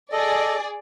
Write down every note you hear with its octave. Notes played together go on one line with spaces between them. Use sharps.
G#4 A4 D5 D#5